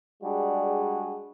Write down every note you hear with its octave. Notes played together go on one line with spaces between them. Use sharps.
G3 G#3 D4 F#4 G#4